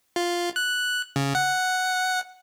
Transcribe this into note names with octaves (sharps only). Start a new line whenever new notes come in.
F4
F#6
C#3
F#5